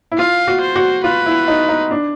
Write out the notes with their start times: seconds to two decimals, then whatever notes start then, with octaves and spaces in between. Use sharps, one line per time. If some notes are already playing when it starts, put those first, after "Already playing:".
0.12 E4
0.18 F4 F5
0.48 F#4
0.61 C5
0.76 F#4
1.04 F4 B4
1.26 E4
1.48 D#4
1.69 D#4
1.91 D4